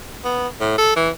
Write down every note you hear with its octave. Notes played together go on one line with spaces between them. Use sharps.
B3
A2
A4
E3